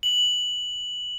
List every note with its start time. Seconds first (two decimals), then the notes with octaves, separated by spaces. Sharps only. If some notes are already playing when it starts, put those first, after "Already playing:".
0.03 F#7